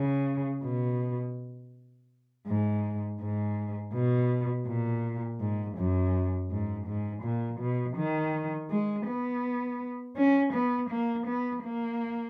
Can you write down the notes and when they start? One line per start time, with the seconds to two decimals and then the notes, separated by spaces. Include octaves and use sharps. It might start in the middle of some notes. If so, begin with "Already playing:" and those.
Already playing: C#3
0.64 B2
2.47 G#2
3.21 G#2
3.94 B2
4.67 A#2
5.41 G#2
5.77 F#2
6.51 G#2
6.87 G#2
7.23 A#2
7.60 B2
7.97 D#3
8.70 G#3
9.07 B3
10.16 C#4
10.53 B3
10.90 A#3
11.27 B3
11.63 A#3